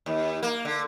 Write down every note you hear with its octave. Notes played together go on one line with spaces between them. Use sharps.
D#2
A#3
D3